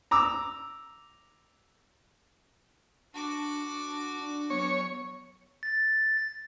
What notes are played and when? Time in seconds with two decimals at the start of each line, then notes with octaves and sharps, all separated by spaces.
0.11 A#5 D6 E6
3.14 D4 F#4 A5 D6
4.20 D4
4.50 F#3 B3 C#5
5.63 A6